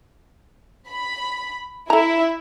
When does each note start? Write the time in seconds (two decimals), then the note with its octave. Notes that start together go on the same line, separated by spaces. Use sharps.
0.88 B5
1.90 E4 A4 E5 A#5